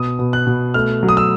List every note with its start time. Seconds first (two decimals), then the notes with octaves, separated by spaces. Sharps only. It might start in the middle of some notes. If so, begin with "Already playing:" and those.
Already playing: B2 D#6
0.19 B2
0.33 F#6
0.47 B2
0.74 A3 F6
1.03 F#3
1.09 D#6
1.17 E6